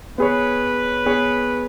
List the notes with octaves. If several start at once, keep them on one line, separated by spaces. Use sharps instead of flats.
B3 G#4 B4 C#5
B3 G#4 C#5